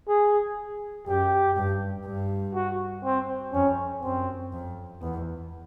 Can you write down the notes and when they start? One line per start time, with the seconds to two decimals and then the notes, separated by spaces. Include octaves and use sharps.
0.08 G#4
1.07 F#2 G4
1.57 G2
2.06 G2
2.55 F#4
3.05 C4
3.53 F2 C#4
4.03 F#2 C4
4.53 F2
5.02 E2 B3